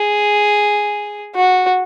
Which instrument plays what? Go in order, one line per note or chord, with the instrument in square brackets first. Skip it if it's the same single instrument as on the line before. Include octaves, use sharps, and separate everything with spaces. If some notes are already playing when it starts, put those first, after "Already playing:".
Already playing: [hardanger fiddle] G#4
F#4